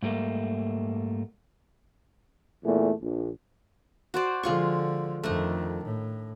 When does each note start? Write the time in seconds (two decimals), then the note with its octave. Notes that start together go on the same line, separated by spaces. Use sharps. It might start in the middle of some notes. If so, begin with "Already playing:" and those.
0.03 G#2 G3 A3 A#3
2.64 E2 A#2 A3
3.01 A#1
4.14 F#4 C5 D5
4.43 D3 F3 G#3 F4 C#6
5.24 F2 D#3 A3 D4 D#5
5.84 A2